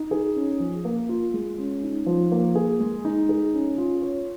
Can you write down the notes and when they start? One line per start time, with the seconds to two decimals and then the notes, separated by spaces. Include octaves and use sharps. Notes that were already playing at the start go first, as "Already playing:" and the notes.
Already playing: D#4
0.11 G#4
0.36 C#4
0.60 F3
0.85 A#3
1.09 F4
1.34 G#3
1.58 C#4
1.83 D#4
2.06 F3
2.32 A#3
2.55 G#4
2.80 G#3
3.05 D#4
3.29 G#4
3.54 C#4
3.78 F4
4.02 C#5